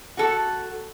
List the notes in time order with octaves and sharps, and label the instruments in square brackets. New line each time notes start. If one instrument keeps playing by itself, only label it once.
[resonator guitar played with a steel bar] F#4 A4